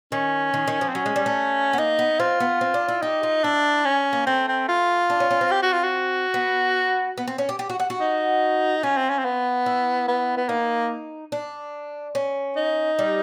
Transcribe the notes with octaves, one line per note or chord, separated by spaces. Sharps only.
D#3 C#4
D#3
D#3
F3
C4
F#3 C#4
G#3
G3
A3
B3
A#3 D#4
B3
C4 F4
B3
C4
D4
E4
D#4 G4
F4
D4 E4
C#4
A#3
A3 C4
C4
F4
D4
C#4
C#4
C4
G4
F#4
F4
F#4
B3
B3
C4
C#4
G4
G4
F#4
F#4
F#4
D#4
C#4 F4
C4
C#4
C4
B3
E4
B3
B3
A#3 D#4
D4
C#4
D#4
G3